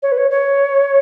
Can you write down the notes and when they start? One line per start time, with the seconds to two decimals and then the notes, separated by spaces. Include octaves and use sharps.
0.03 C#5
0.12 B4
0.18 C#5
0.31 C#5